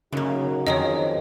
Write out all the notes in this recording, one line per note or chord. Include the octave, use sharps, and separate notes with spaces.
F#2 C#3 A#3 D#4 F#4
F2 D#3 G#4 A#4 C#5 D#5